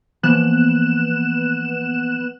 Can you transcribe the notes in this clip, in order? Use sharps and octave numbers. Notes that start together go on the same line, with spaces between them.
E3 F3 A#3 B3 F#6 E7